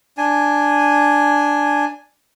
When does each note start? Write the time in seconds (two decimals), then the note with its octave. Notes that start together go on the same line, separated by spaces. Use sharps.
0.17 D4 G#5